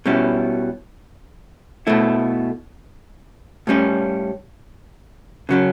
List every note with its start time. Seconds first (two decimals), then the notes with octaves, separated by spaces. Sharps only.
0.06 B2 G3 C#4 E4
1.87 B2 A3 E4
3.67 A2 G3 C#4
5.49 C#3 F#3 C#4